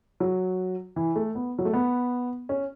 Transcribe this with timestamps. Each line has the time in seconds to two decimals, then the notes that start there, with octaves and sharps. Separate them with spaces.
0.20 F#3
0.96 E3
1.16 A3
1.35 B3
1.59 F#3
1.65 A3
1.73 B3
2.49 C#4